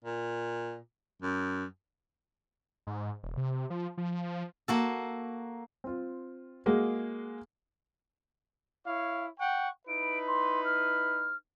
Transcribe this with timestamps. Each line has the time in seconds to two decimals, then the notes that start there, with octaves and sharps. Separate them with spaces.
0.04 A#2
1.22 F#2
2.87 G#2
3.24 E1
3.37 C3
3.70 F3
3.98 F3
4.68 A#3 F#4 A4
5.84 C4 F4
6.66 G#3 A#3 F#4 G#4
8.86 E4 C#5 F5
9.38 F#5 G5 C#6
9.88 D#4 E4 B4 D7
10.27 C6
10.64 F6